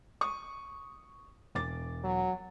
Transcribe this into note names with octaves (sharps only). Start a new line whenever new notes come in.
C#6 D#6
E1 D6 A6
F#3